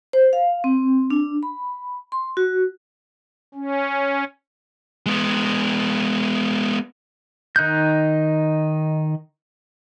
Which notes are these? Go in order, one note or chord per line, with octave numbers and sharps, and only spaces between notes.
C5
F5
C4
D4
B5
C6
F#4
C#4
G#3 B3
D#3 D#4 F#6 G6